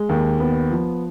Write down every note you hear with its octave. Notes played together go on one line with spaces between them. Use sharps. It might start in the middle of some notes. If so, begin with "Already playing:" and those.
Already playing: G#3
D#2
B3
F3